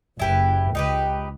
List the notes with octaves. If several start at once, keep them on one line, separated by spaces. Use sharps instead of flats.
F#1 E4 G4 B4
C#2 D#4 G4 B4